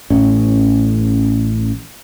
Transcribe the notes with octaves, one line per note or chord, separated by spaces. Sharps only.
A1 A2 C#4